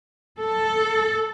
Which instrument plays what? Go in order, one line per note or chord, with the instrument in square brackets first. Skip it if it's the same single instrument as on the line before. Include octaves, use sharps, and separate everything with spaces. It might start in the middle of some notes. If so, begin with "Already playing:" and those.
[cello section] A4